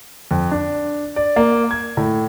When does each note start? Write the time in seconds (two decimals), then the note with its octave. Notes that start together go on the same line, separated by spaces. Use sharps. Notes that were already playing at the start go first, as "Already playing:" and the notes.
0.31 F2
0.51 D4
1.16 D5
1.36 A#3
1.71 G#6
1.97 A2